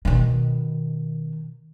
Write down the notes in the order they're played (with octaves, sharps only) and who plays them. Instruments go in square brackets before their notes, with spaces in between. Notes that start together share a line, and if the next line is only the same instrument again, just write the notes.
[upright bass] B2 D#3